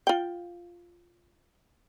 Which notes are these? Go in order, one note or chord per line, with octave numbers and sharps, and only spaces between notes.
F4 G5